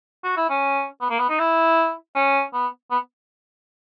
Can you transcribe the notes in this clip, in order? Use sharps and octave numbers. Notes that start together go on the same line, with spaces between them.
F#4
E4
C#4
B3
A#3
B3
D#4
E4
C#4
B3
B3